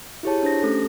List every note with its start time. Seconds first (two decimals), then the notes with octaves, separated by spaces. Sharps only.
0.23 E4 F4 G4 G#4 C#5 A5
0.43 D4 C5 A#6
0.63 A3 C#4 G4 A4